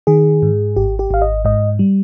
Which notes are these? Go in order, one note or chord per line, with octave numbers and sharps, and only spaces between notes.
D#3 G#4
G#2
G#1 G4
G4
G#1 F5
D#5
G#2 D#5
G3